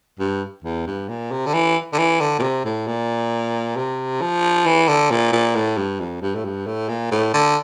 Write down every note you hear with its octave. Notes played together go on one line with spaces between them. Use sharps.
G2
E2
G2
A#2
C3
D3
E3
D3
E3
D3
A#2
C3
A2
A#2
C3
F3
E3
D3
A#2
A#2
A2
G2
F2
G2
A2
G2
A2
A#2
A2
D3